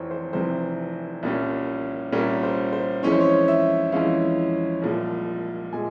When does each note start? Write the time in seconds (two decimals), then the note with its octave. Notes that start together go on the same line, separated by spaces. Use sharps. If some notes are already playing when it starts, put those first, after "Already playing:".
Already playing: F1 F2 C3 E3 C5 C#5
0.11 C5
0.33 F1 F2 C3 E3 C5
1.23 C2 A#2 G3 C#4
2.12 C2 A#2 G3 C#4 A#4
2.43 C5
2.73 C5
3.03 F2 E3 G#3 C#4 E4 C#5
3.12 C5
3.21 C#5
3.48 E5
3.92 F2 E3 G#3 C#4 E4 F5
4.82 C2 A#2 F3 G#3
5.73 A#2 F3 G#3 G#5